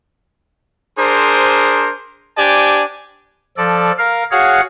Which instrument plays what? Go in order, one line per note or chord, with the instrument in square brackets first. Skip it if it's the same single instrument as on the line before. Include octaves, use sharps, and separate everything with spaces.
[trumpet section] D4 G#4 A#4 C5
D4 G4 C5 D5 G#5
[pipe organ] F3 A4 D5
A#4 F5
F#4 G#4 C#5 F5 F#5